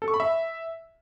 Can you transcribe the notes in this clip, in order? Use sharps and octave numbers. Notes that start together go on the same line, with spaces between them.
A4
C#6
B5
E5